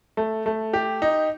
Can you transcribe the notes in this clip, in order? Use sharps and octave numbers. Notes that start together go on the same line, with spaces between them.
A3
A3
G4
D#4